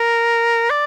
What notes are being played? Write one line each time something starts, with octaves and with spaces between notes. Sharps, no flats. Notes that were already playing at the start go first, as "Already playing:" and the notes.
Already playing: A#4
D5